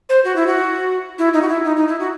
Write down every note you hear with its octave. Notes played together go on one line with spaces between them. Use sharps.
C5
F#4
E4
F#4
E4
D#4
F#4
E4
D#4
D#4
E4
F#4